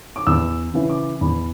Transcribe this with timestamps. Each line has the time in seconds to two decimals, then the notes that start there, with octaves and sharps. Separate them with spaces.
0.16 D6
0.27 E2 E6
0.74 C#3 E3
0.89 D6
1.21 E2 B5